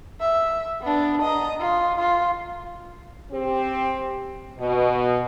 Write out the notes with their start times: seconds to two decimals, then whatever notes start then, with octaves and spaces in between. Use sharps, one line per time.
0.21 E5
0.82 B3 D4
1.23 D#5 A#5
1.60 F4
1.98 F4
3.32 C4 G4
4.59 B2